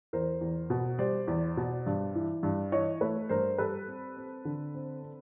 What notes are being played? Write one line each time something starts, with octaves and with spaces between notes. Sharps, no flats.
E2 A#4 C5
E2
B2
G3 C5 D5
E2
B2
G2
E3
G2
E3 C#5 D#5
A3 B4 C#5
G2 A#4 C5
G3 A4 B4
C4
C4
D3
C4
C4